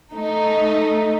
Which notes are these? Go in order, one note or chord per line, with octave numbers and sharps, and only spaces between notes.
A3 D#4